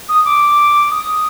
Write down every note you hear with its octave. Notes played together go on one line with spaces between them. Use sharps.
D#6
D6
D#6